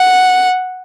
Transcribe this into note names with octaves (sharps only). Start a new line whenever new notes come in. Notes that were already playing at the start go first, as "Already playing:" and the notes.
Already playing: F#5